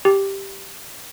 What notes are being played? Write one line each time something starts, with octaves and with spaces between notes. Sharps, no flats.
G4